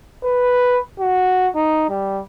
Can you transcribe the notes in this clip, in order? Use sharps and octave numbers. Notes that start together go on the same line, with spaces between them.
B4
F#4
D#4
G3